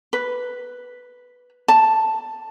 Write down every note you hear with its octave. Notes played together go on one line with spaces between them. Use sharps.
B4
A5